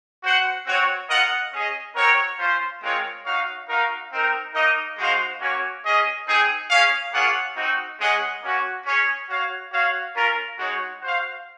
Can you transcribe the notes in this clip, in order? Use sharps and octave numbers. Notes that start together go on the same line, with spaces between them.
F#4 C5 F#5
C4 F#4 C#5
F4 A#4 D#5 F#5
C#4 G#4 D#5
C4 F#4 A#4 C#5
C#4 F4 C5
G#3 C4 F4 A#4 C#5
D#4 F#4 C#5 F5
D#4 F#4 A#4 F5
C4 D#4 A#4
A#3 D#4 A#4 D#5
G#3 D#4 F#4 C5 F5
A#3 C#4 F#4 C#5
C#4 G#4 D#5
C4 D#4 G#4
C#4 G#4 C#5 F5
A#3 F4 G#4 C#5 F#5
C4 D#4 F#4
G#3 C#4 G#4 D#5 F#5
A#3 C#4 F#4
C#4 G#4 C#5
F#4 C#5 F5
F#4 C#5 F5
C#4 F4 A#4
G#3 D#4 F#4 C#5
F#4 C5 F5